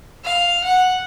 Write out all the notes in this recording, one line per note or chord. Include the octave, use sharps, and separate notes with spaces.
F5
F#5